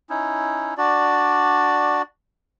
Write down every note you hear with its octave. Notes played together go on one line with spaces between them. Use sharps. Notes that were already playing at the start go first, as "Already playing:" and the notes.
C#4 D#4 E4
D4 F#4 D5